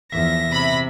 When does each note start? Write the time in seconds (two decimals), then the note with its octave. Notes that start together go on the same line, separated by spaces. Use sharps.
0.12 E2 F3 E5 A#6
0.51 C3 B5